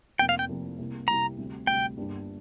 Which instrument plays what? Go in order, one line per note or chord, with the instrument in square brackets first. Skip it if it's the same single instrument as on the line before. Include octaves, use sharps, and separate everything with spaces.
[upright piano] F1 F2 C3 A#3 [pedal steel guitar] G5
[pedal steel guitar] F5
G5
[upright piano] F1 F2 C3 A#3
C2 C3 G3 A#3
[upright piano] C2 C3 G3 A#3 [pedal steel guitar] A#5
[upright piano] D2 C3 G3
[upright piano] D2 C3 G3 [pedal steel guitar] G5
[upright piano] G1 G2 G3 A#3 D4